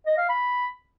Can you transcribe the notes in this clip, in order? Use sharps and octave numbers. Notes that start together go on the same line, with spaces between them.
D#5
F5
B5